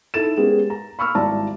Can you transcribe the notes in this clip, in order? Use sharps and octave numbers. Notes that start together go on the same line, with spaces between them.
D#4 E4 A4 A6 E7
G#3 B3 C#4 G4 G#4 A#4
A#5
B5 C#6 E6 F6
G#1 G3 E4 D5 A5 A#5